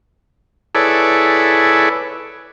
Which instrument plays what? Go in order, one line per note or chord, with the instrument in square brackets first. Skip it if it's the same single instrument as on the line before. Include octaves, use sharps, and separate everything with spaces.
[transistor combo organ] E4 G#4 A4 B4 C#5 D5